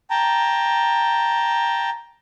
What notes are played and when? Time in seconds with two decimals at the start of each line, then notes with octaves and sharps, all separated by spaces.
0.10 G5 A5 A#5